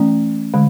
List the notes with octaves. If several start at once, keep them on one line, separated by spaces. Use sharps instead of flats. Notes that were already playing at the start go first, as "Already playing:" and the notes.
Already playing: E3 A3 C#4
D3 G#3